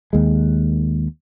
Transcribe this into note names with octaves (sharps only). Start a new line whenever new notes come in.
D#2 G#3